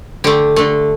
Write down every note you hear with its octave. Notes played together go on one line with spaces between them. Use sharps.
D3 A3 G4
D3 A3